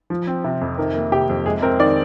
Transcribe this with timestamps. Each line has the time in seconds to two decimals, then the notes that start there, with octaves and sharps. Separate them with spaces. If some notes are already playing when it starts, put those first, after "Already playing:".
0.10 F3
0.27 C4
0.44 C3
0.61 F2
0.78 D#3 A#4
0.95 A#3
1.12 C3 G4
1.29 F2
1.46 G#3 G#4
1.62 C4 A#4
1.79 D#3 D5